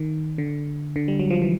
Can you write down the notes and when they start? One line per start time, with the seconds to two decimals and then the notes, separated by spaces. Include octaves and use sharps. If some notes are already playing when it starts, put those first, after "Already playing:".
Already playing: D#3
0.38 D3
0.96 D3
1.08 G3
1.19 F#3
1.30 F3
1.42 E3